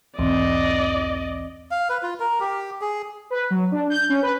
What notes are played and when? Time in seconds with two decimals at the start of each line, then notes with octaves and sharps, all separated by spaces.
0.19 B1 E2 G#2 C4 D5 D#5
1.71 F5
1.90 B4
2.03 F4
2.20 A#4
2.40 G4
2.81 G#4
3.30 B4
3.50 F#3
3.72 D4
3.90 G6
4.09 C#4
4.22 B4